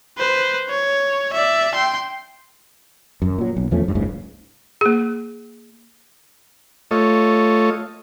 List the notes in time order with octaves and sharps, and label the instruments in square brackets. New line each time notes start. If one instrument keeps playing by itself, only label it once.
[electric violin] B4 C5
C#5
D5 E5
G5 C6
[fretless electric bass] F#2
A#2 F#3
B1
E2 F3 A3 C#4
E2 G2
F#1 C#2 G#2 C#3
[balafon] A#3 G#4
[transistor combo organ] A3 F4 A4 C#5 D#5